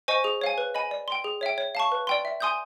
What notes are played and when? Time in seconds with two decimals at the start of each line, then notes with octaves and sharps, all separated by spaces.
0.08 C5 D#5 G#5 C#6
0.24 G#4
0.41 C#5 F5 G#5
0.58 B4
0.74 D#5 G#5 B5
0.91 D5
1.08 G5 C6
1.24 G#4
1.41 C#5 E5 G5
1.58 C#5
1.75 F5 A5 C#6
1.92 B4
2.07 D5 G5 C6
2.25 E5
2.40 G#5 C6 D#6 G6